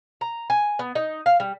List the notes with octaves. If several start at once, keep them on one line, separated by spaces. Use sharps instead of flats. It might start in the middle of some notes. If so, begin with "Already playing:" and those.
A#5
G#5
B3
D#4
F5
G3